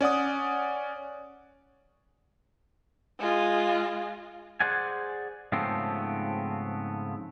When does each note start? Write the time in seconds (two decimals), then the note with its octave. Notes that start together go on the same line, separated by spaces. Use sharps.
0.01 C#4 D5 F#5 D#6
3.19 G#3 F4
4.60 G#4 C5 D5 F#5 G#5
5.52 G#2 C#3 F3 A3 B3 C4